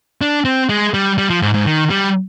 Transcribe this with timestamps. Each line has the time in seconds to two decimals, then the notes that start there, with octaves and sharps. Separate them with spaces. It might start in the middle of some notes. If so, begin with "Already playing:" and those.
0.21 D4
0.45 C4
0.69 G#3
0.94 G3
1.18 G3
1.30 F3
1.42 G#2
1.54 G#2
1.66 D#3
1.90 G3